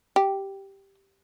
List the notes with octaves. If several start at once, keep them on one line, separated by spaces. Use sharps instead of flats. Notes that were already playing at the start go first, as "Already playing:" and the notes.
G4